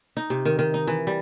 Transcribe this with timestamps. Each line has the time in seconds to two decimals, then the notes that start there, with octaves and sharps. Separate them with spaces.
0.17 D#4
0.30 C3
0.45 D#3
0.59 D#3
0.74 D#4
0.87 E3
1.07 G3